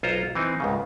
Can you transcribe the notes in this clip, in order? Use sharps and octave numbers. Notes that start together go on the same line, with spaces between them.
B1 F4 C5 C#5 A#5
E3 C4 D#4
C#2 G#2 C#3